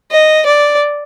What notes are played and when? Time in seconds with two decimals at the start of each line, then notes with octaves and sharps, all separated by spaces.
0.11 D#5
0.46 D5